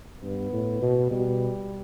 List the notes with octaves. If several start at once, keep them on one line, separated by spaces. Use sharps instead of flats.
G2 B3
A2
B2
B2 G3